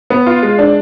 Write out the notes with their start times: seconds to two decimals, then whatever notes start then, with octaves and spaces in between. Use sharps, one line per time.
0.10 B3
0.26 F4
0.43 G#3
0.59 D4